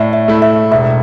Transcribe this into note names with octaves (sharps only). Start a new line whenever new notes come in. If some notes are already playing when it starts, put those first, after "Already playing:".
Already playing: A2 D5 E5
E5
A3 E4
E5
E1 E5